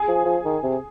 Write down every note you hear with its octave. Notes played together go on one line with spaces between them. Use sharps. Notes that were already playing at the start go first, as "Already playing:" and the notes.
Already playing: G#4
F3
F3
D#3
C3